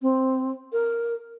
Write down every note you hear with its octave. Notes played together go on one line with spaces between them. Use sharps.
C4
A#4